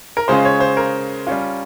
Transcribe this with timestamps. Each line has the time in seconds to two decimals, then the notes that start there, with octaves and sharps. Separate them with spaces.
0.17 A#4
0.28 C#3 G#3 C#4 F4 C5
0.45 C#5
0.60 C5
0.77 A#4
1.27 G3 C#4 F4